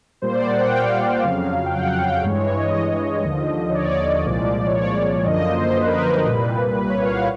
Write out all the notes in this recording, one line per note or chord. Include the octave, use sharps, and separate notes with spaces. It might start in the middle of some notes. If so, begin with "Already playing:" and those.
A#2 G3 A#3 C5
D5
F#5
G5
F5
F2 C#3 F#3
G5
F#5
G5
G2 E3 G#3 C#5
C#5
D#5
D#2 D3 F3
C#5
D5
C2 A#2 F3 G#3
C#5
D5
F#2 D3 F3 A#3 D#5
C5
B4
A#4
B4
C2 A#2 G3 A#3
B4
C#5
F5
F#5